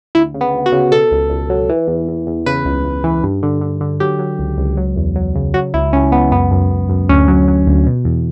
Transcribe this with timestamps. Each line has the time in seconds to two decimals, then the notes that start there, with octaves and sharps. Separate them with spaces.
0.15 D2 E4
0.34 C#3
0.41 B3
0.54 D2
0.66 F#4
0.72 C#3
0.91 B2 A4
1.11 C#2
1.30 C#2
1.50 F#3
1.69 E3
1.88 E2
2.08 E2
2.27 E2
2.46 C#3 B4
2.65 C#2
2.85 C#2
3.04 E3
3.23 G2
3.43 D3
3.61 D3
3.81 D3
4.00 F#3 G4
4.19 F#3
4.39 C#2
4.58 C#2
4.77 F#3
4.96 E2
5.16 F#3
5.35 C#3
5.54 F#3 F#4
5.74 C#2 E4
5.93 C#2 C#4
6.12 C#2 B3
6.31 F#2 B3
6.51 F#2
6.70 F#2
6.89 F#2
7.09 D2 C#4
7.28 F#3
7.48 F#3
7.67 D2
7.86 B2
8.05 E2